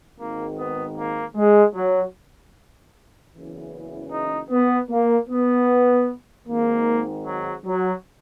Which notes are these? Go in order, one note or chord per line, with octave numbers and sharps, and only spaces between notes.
G#1 G#2 D#3 A#3
B3
A#3
G#3
F#3
F#1 E2 C#3 E3
D#4
B3
A#3
B3
G#1 G#2 D#3 A#3
F#3
F#3